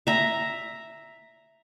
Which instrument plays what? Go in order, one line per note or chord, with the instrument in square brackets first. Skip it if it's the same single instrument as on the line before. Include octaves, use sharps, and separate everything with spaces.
[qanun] E5 A#5